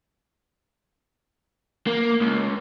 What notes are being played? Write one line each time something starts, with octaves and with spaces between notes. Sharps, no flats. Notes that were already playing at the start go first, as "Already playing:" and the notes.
A#3
C#2